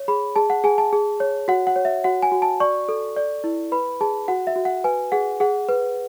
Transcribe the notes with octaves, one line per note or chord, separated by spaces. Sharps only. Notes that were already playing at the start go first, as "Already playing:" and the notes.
Already playing: C#5
G#4 B5
G#4 A5
F#5
G#4 G#5
A5
G#4
C#5
F#4 F#5
F#5
C#5
E5
F#4 F#5
G#5
F#4
A5
D5 C#6
A4
D5
E4
B4 B5
G#4 A5
F#4 F#5
E5
F#4
F#5
B4 G#5
G#4 F#5
G#4 F#5
B4